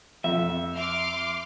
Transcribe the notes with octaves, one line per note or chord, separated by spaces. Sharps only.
F2 E5
C6 D6 F6